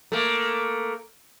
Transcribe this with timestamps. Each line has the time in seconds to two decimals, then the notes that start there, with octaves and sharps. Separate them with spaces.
0.12 A3 A#3